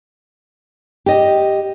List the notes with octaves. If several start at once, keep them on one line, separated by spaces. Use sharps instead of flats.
G4 D#5